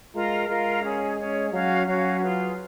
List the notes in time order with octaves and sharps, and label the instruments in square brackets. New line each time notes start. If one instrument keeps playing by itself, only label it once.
[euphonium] G#3 [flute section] F4 A#4 F5 A#5
[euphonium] G#3 [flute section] F4 A#4 F5 A#5
[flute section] C#4 G#4 C#5
C#4 G#4 C#5
[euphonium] F#3 [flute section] C#4 F#4 C#5 F5
[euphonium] F#3 [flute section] C#4 F#4 C#5 F5
[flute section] F4 G#4 B4 F5